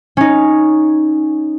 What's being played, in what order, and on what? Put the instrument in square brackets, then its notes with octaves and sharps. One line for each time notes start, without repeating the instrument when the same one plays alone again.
[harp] C#4 D#4